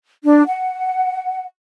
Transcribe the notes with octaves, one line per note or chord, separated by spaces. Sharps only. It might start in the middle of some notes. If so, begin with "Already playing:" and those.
D4
F#5